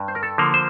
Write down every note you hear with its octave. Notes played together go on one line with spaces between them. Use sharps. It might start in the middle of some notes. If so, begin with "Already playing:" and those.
Already playing: G2
C5
A#4
A4
D3 F3 A#3
C5